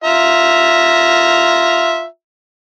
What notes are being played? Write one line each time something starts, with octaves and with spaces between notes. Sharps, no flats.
F4 E5 A#5